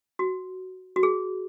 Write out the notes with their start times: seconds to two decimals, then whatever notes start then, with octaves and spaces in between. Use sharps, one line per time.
0.19 F#4
0.96 F#4
1.03 G#4